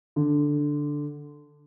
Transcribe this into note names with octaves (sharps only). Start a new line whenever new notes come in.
D3